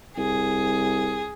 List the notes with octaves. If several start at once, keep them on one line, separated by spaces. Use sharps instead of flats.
C2 G#4